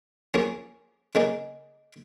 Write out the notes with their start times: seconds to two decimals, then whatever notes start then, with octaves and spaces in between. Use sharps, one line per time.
0.34 F3 A#3 C#4 G#4
1.15 C#3 A#3 D#4 G#4